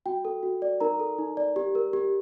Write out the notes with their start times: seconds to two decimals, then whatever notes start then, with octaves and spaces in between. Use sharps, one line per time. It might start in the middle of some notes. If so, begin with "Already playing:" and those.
0.06 F#4 G5
0.25 A4
0.43 F#4
0.62 D5
0.80 D#4 A#4 A#5
1.00 A4
1.18 D#4
1.37 D5
1.56 G4
1.75 A#4
1.93 G4